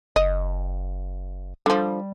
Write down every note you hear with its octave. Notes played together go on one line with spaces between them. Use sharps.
F#1 D#5
D3 F3 G3